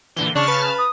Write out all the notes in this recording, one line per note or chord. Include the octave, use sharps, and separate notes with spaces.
A#2 D3 E3 G7
C#3 D4 A5 C#6 F6
B4
D#6